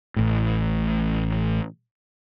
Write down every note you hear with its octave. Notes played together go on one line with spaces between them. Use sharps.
A1 A2